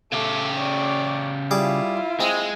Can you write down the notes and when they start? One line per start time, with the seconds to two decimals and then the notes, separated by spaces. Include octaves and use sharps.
0.12 C#3 A3 G4
0.55 C#5 D5
1.51 G3 E4 F4 G#4 D6
2.20 G#3 C4